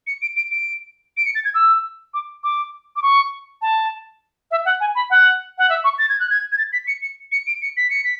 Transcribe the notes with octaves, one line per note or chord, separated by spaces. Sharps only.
C#7
D7
D7
D7
D7
C#7
A6
G#6
E6
D6
D6
D6
C#6
A5
E5
F#5
G#5
B5
F#5
F#5
E5
C#6
A6
G#6
F#6
G#6
G#6
A6
B6
C#7
C#7
C#7
D7
C#7
B6
C#7
B6